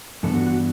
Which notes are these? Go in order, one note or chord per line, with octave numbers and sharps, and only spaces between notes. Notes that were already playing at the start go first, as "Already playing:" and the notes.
G2 E3 B3 D4 A4
F#4
F#4